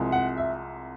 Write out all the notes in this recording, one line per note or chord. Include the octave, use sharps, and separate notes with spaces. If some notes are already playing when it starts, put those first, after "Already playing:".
Already playing: C2 C3 F3 G#3
F#5
E5